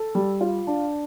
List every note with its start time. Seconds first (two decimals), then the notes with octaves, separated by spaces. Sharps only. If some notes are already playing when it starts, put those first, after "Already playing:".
Already playing: A4
0.15 G3
0.41 F4
0.67 D4